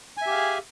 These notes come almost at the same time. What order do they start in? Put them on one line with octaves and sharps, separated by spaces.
G#5 E5 G4 F5 G#4